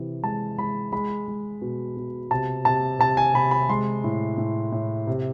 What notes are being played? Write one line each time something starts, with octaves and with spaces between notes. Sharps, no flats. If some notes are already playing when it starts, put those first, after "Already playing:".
Already playing: C3 E3
G#3 A5
G#3 B5
G#3 B5
G#3
B2
B2
C3 A5
C3 A5
C3 A5
G#5
C3 B5
B5
G#3 C6
A2
A2
A2
C3